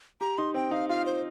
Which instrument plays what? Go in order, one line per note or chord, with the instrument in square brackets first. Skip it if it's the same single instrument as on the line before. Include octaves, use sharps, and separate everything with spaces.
[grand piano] G4 [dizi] A#5
[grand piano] D#4 [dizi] C6
[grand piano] C4 [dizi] G5
[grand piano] D#4 [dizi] F5
[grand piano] F4 [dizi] F5
[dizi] C5